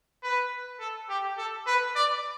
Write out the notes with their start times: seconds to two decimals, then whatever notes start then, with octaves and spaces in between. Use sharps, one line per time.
0.23 B4
0.80 A4
1.09 G4
1.38 A4
1.67 B4
1.96 D5